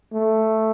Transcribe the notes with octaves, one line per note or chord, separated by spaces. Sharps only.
A3